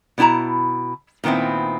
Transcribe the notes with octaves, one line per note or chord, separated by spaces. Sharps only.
B2 D4 E4 A5 A#5
A#2 D#3 B3 C4 E4